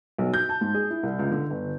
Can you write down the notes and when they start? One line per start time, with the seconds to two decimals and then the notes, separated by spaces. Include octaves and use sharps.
0.18 B1
0.34 G6
0.49 A5
0.61 G#2
0.74 G#4
0.90 E4
1.03 C2
1.19 C#2
1.31 D3
1.50 G1